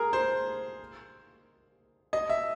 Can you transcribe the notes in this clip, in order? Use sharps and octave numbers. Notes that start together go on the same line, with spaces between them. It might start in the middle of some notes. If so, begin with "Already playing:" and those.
Already playing: G#4 A#4
C5
D#5
E5